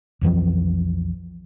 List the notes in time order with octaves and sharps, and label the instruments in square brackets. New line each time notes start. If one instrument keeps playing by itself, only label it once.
[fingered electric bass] B1 F2 E3 F3